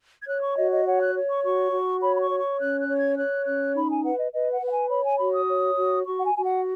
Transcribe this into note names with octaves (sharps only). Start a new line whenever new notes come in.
G#6
C#5 F#6
C#6
F#4 D#5
D#5
C#5 F#5
F#6
C#5
C#6
F#4 C#6
F#4
C#5 B5
B5
C#6
C#5
C#6
C#4 F#6
F#6
C#5
G#6
C#5 F#6
C#4 F#6
D#4 B5
G#5
B4 F#5
D#5
B4 D#5
F#5
B4
F#5
G#5
C#5 B5
G#5
F#4 B5
D#6
C#5
F#4
F#4 C#6
F#5
G#5
F#4 G#5
F#5